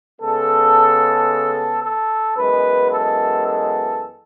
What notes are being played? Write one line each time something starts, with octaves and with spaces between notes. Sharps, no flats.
C#3 G#3 B3 A4
A4
F#2 E3 G#3 B3 B4
A4
A4